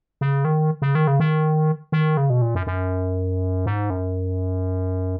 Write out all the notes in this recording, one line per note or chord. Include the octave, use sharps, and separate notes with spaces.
C#3
D#3
C#3
D#3
C#3
D#3
D#3
C#3
B2
A#2
F#2
F#2
G#2
F#2